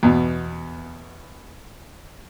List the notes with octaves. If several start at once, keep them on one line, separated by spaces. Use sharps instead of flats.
E2 B2